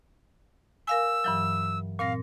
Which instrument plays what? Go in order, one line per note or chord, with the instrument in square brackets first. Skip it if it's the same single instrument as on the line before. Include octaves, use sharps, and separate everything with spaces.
[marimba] A#4 F5 G#5 [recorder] E6
[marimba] G2 E3 F#3
[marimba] A#2 C4 A#6 [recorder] F5